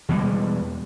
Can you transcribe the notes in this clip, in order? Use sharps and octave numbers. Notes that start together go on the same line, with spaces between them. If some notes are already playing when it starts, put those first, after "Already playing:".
E2 B2 G3 G#3